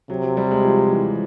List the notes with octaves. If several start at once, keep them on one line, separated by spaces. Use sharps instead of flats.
C3 F#3
F#3
G3
G#3
F3
E3